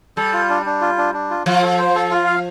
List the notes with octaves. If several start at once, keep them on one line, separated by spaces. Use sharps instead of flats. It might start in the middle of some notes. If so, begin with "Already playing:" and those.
G3 A4
F4
D4
D4
F4
D4
D4
F4
F3 F4
A4
C5
A4
F4
F5